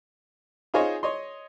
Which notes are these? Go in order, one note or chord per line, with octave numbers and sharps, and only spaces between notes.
D#4 F4 G#4 C5 C#5 D#5
C#5 D#5 C6